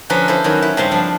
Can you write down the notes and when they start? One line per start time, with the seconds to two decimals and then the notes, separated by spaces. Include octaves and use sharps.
0.10 D3 F3 C#4 B4 A5 A#5
0.28 E4 A4 B4 C5
0.44 D#3 F#3 C#4
0.62 E4
0.77 G2 C#3 G3 C4 A5 C6
0.91 F3 D4